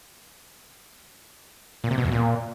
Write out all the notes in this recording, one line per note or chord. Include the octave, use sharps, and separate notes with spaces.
A#2
C3
B2
E2
A#2